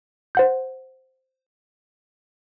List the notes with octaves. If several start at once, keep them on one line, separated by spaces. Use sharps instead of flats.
C5 F#5 G6